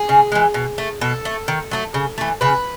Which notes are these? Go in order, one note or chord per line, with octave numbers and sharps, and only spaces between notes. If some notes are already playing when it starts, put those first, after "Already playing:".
Already playing: G#4
C#3
E3 G#3
B2
A3
B2 A4
A3
D#3
F#3 A3
C#3
E3 A3
C#3 B4